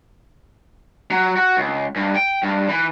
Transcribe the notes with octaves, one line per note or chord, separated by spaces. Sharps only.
F#3
F#4
C#2
G2
G5
G2
E3